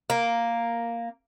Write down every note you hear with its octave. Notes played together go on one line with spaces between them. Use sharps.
A#3